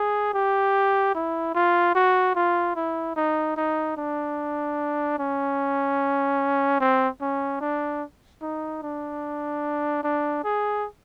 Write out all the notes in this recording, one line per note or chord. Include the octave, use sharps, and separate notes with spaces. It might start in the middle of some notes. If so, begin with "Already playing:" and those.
Already playing: G#4
G4
E4
F4
F#4
F4
E4
D#4
D#4
D4
C#4
C4
C#4
D4
D#4
D4
D4
G#4